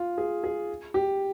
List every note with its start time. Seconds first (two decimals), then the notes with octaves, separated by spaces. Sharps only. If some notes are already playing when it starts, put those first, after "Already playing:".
Already playing: F4
0.18 G#4
0.44 G#4
0.94 G4